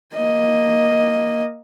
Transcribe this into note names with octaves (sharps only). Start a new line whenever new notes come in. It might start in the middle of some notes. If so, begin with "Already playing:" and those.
A#3 D#5